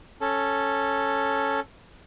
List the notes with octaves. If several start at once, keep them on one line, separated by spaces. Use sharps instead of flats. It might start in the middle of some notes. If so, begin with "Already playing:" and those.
C#4 A4